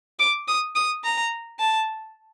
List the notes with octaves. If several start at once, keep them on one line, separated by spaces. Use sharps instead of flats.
D6
D#6
D#6
A#5
A5